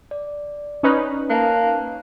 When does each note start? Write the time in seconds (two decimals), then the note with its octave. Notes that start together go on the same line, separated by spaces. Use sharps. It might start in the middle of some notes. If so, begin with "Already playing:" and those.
0.11 D5
0.83 C#4 D#4 B4
1.30 A#3 F5 A5 F#6